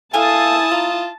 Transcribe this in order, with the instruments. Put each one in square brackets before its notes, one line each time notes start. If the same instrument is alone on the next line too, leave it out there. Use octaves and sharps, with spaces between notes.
[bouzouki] A3 A4 F5 [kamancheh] E4 D#6 [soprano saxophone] G#5 [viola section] A5
[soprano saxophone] F4 [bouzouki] A#5